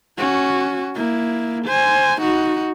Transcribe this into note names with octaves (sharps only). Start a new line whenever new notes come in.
C#4 F#4
A#3 E4
C5 G#5
D#4 F#4